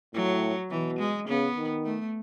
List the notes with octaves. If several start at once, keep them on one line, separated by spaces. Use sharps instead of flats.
A2 F#3
B2 E3
G#3
C#3 B3
D#3
A3